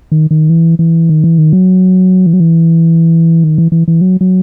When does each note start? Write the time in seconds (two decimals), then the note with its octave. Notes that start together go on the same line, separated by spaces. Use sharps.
0.12 D#3
0.31 D#3
0.50 E3
0.79 E3
1.09 D#3
1.24 E3
1.38 D#3
1.53 F#3
2.26 E3
2.33 F#3
2.40 E3
3.44 D#3
3.58 E3
3.72 E3
3.88 E3
4.01 F#3
4.21 F#3